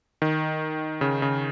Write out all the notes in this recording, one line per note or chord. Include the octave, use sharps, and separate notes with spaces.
D#3
C#3
C#3